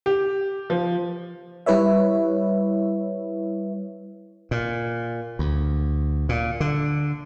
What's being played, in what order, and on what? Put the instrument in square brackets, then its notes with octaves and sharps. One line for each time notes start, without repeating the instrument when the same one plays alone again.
[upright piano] G4
F3
[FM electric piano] G3 E4 B4 C#5 E5
[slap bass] A#2
D2
A#2
D3